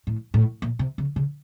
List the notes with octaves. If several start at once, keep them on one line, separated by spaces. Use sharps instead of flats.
A2
A2
A#2
C3
C#3
C#3